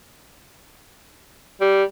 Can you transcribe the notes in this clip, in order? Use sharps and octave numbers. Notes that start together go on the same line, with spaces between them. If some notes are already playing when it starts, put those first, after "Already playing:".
G3